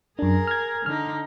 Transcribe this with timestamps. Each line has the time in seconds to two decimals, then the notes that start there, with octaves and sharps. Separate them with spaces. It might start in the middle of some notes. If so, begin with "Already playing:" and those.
0.19 F#2 D4 G#4 A#4
0.47 F6 G#6
0.86 D3 D#4 F6